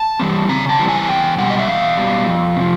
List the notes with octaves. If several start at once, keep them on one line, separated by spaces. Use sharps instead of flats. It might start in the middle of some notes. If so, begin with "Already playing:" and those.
Already playing: A5
E3 G3 C4
C#3 A#5
A5
E3 G3 C4
G#5
E2 G5
B2 G3 F#5
D#5
E5
E2 F5
B2 G3
F2
C3 F3